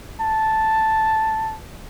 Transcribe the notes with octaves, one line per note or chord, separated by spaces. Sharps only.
A5